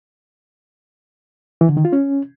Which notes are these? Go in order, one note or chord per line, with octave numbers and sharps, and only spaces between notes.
E3
D3
D#3
F4
C#4